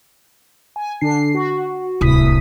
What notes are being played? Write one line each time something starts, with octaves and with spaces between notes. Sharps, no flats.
G#5
D3 D4 C7
F#4
D1 C2 E4 D#6 B6